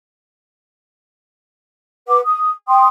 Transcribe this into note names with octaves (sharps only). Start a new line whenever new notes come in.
B4 F#5 D6
D#6
G5 C6 D#6